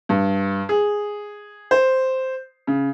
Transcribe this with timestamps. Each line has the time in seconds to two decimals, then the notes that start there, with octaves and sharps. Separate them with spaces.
0.09 G2
0.69 G#4
1.71 C5
2.67 C#3